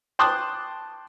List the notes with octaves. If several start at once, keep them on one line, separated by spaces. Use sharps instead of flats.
G5 A5 C6 D6 D#6 F#6